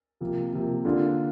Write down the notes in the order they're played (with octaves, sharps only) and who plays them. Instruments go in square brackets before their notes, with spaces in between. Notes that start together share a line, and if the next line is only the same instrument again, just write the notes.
[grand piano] C3 F3 A#3
C3 F3 A#3
D3 A#3 D4 F4